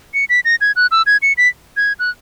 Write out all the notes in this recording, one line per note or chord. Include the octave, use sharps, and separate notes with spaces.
C#7
B6
A#6
G#6
F#6
E6
G#6
C#7
B6
G#6
F#6